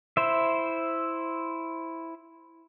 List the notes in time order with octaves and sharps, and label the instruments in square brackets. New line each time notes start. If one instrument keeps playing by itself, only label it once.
[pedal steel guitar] E4 C5 E5